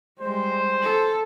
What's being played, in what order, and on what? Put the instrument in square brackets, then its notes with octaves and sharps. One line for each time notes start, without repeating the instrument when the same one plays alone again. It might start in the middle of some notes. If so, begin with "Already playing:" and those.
[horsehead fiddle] G3 G#3 [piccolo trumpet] C5
[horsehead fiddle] A4